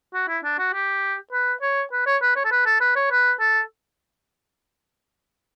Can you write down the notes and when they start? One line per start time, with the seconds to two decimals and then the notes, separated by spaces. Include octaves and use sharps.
0.14 F#4
0.28 E4
0.44 D4
0.59 F#4
0.74 G4
1.33 B4
1.62 C#5
1.93 B4
2.07 C#5
2.22 B4
2.36 C#5
2.45 A4
2.52 B4
2.66 A4
2.81 B4
2.96 C#5
3.11 B4
3.40 A4